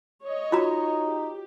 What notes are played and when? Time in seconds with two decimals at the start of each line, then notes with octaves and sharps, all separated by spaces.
0.24 C#5 D#5
0.52 D#4 F4 F#4 A#5
1.04 G4